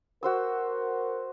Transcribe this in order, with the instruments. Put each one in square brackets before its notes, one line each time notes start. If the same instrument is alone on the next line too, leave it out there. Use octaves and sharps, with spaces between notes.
[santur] F#4 C5 E6 [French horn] A#4